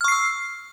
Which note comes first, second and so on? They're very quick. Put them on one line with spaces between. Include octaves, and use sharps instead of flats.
F6 C#6 C7 E6